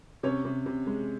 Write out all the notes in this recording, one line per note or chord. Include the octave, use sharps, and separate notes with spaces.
C3 C#4 C#5
C3
C3
G#3